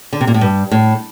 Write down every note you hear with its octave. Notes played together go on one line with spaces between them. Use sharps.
D3
C3
A#2
A2
G2
A2